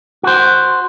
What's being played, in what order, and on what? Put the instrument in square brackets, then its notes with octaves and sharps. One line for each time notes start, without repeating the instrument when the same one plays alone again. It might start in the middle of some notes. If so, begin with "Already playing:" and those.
[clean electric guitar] F#4 C5